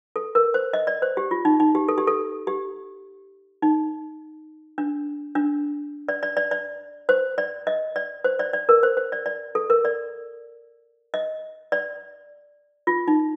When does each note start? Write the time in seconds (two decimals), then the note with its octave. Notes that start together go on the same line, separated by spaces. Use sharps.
0.16 A4
0.35 A#4
0.54 C5
0.73 D#5
0.87 D5
1.02 C5
1.17 G4
1.31 F4
1.45 D#4
1.60 D#4
1.75 G4
1.88 A4
1.98 G4
2.07 A4
2.47 G4
3.62 D#4
4.78 D4
5.35 D4
6.08 D5
6.23 D5
6.37 D5
6.51 D5
7.09 C5
7.38 D5
7.67 D#5
7.96 D5
8.24 C5
8.39 D5
8.53 D5
8.69 A#4
8.83 C5
8.97 C5
9.12 D5
9.26 D5
9.55 A4
9.70 A#4
9.85 D5
11.14 D#5
11.72 D5
12.87 F4
13.08 D#4